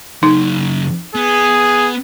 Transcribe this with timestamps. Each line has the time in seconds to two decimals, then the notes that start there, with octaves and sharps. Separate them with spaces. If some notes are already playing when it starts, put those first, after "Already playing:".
0.23 F#2 C#3 D#4
1.15 B3 G#4